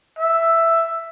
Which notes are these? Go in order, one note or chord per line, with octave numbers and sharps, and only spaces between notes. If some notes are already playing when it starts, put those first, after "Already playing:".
E5